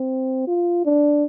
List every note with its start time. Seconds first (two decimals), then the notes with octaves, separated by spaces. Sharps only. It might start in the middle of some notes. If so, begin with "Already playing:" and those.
Already playing: C4
0.48 F4
0.85 D4